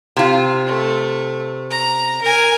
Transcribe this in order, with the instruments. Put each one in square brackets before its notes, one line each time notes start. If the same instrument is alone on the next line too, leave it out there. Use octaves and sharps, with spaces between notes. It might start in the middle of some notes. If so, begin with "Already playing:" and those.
[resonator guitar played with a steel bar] C3 F4
[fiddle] A3
A#5
A#4 G#5